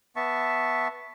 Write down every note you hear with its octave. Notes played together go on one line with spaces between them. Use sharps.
B3 E5 A5 C#6